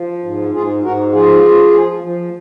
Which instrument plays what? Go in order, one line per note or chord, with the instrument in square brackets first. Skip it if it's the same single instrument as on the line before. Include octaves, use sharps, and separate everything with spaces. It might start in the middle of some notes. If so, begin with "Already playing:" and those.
Already playing: [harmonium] F3
G#2
G#2 F4 G#4
G#2 F#4 A#4
F#4
F3 F4 G#4
F3
F3
F3